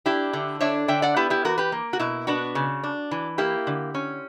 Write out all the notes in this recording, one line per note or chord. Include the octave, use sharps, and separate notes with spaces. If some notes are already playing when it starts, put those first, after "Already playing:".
D4 E4 G4
D3
D4 C#5 E5
D3 E5 G5
D5 F#5
B3 E4 G4
E4 G4
E3 F#4 A#4
G4 B4
A#3
F#4
B2 E4
B3 D4 F#4
C#3
D4
E3
A#3 E4 G4
D3
C#4